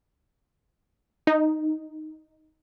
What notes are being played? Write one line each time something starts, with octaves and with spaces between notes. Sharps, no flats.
D#4